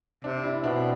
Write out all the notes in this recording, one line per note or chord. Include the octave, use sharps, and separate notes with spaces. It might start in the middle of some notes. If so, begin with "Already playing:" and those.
C3 D4
E4
B2 D4
C4